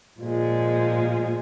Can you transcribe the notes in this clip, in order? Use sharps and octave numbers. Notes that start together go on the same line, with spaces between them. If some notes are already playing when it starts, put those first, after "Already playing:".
A#2 F3 G#3